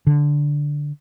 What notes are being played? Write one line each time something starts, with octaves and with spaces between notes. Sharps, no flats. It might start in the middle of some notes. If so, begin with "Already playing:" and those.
D3